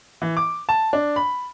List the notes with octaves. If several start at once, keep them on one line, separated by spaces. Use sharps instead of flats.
E3
D6
A5
D4
B5